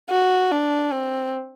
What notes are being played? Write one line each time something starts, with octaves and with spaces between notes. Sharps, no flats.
F#4
D4
C4